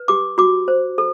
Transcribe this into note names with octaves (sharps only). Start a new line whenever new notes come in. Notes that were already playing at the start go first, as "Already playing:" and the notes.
Already playing: B4
G4 D6
F#4 D6
C5
A4